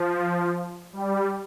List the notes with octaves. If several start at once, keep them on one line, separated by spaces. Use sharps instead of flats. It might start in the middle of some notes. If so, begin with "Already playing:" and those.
Already playing: F3
G3